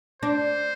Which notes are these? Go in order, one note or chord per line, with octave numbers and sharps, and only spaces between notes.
D4 C5